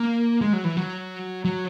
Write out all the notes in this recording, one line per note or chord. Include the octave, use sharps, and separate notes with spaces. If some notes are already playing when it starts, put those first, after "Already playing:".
Already playing: A#3
G#3
F#3
E3
F#3
F#3